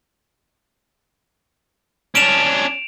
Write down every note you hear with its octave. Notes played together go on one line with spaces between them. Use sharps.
C#4 D4 D7 E7 F7